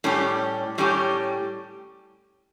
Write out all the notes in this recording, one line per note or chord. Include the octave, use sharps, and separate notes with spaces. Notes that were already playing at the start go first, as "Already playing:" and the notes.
A2 G3 C#4 G4
A2 G3 C#4 G4